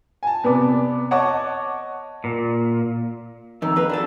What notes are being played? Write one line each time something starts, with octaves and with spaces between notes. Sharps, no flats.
G#5 A5
C3 B3 D5 D6
C#5 D#5 F#5 A5 C#6 D6
A#2
F2 D#3 A#5 E6
A#3 B4
D4 F#4 A4 G5